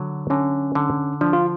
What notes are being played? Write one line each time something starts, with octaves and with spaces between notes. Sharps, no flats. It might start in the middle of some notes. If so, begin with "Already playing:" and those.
Already playing: D3 F#3
D3 C#4
D3
F3 D4
F4